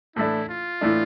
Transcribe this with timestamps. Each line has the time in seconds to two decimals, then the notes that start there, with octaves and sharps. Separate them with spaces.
0.16 A2 E3 A3 D4 E4
0.49 F4
0.81 A2 E3 A3 D4